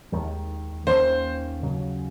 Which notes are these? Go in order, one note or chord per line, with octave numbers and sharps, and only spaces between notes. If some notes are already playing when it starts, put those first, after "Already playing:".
D#2 D#3 G#3
D#2 D#3 A#3 C#4 C5
D#2 C#3 F#3